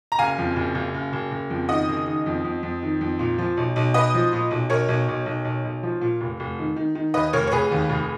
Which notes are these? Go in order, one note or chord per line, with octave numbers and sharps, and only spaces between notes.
A#5
F#1 F5 G#5
F2
F#1
F#1
F#1
F#1
F#1
F2
D#3 D#5 F#5
F#1
D#3
F2
F2
F2
D#3
F2
A#2
F3
B1
B1
B1 B4 D#5
F3
A#2
B1
B1 A#4 C#5
B1
B1
B1
B1
B1
F3
A#2
F1
F1
D#3
D#3
D#3
D#2 B4 D#5
F1 A#4 C#5
C#5
F1 G#4 B4
D#2
F1